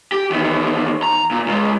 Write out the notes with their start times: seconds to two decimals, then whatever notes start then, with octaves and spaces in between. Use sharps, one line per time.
0.12 G4
0.30 E2 D#3
1.03 A#5
1.31 A#2
1.46 C#2 G#3